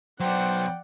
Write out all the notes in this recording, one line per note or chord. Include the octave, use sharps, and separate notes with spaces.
F#3 B3 C5 D5 F#5 G5